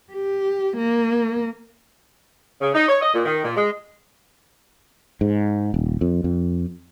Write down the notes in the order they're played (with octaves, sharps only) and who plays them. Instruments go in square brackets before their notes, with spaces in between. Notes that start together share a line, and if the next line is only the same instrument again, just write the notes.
[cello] G4
A#3
[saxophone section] C#3
D#4
C#5
D#5
A#2
D#3
A#2
G#3
[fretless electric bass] G#2
D#1
F2
F2